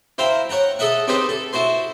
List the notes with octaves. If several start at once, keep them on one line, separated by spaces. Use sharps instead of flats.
E4 C5 F5 G5 A#5
C#5 F#5 G5 A#5
G#4 A4 D#5 E5 F#5
C4 D#4 G4 G#4 B4 C5
A4
E4 F#4 C5 C6